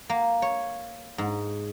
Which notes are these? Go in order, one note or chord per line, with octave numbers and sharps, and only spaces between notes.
A#3
C#5
G#2